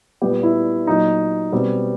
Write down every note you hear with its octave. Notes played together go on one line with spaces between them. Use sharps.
A#2 G3 B3 G4
E4
A#2 F#3 A#3 D#4
B2 G3 C4